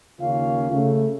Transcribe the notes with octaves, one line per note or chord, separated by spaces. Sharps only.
D#2 C#3 A#3 C#4 F4 F5
C#3 A3